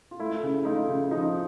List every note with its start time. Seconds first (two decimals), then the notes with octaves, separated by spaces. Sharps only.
0.11 F4
0.19 A3 E4
0.43 C#3
0.65 A3 D#4 F4
0.88 C#3
1.11 F3 D#4